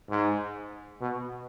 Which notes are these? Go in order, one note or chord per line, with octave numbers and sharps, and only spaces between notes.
G#2
B2